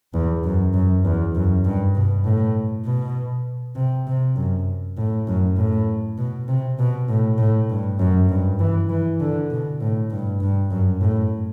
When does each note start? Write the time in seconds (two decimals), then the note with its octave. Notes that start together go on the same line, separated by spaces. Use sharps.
0.14 E2
0.44 F#2
0.74 F#2
1.05 E2
1.35 F#2
1.65 G2
1.95 B2
2.25 A2
2.85 B2
3.76 C3
4.07 C3
4.36 F#2
4.97 A2
5.27 F#2
5.57 A2
6.18 B2
6.48 C3
6.79 B2
7.08 A2
7.38 A2
7.69 G2
7.99 F#2
8.29 G2
8.59 E3
8.89 E3
9.20 D3
9.50 B2
9.80 A2
10.10 G2
10.40 G2
10.71 F#2
11.01 A2